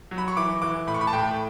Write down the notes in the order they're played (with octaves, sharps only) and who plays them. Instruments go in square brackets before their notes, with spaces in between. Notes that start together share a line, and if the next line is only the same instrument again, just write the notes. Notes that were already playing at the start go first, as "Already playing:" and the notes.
[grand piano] F#3
B5
C#6
E3 D6
E3 D6
A2 B5
C#6
B5
A5
A2 G5